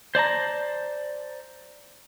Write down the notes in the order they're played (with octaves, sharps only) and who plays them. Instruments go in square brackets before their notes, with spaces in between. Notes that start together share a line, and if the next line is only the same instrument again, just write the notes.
[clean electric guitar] C5 D5 A5 A#5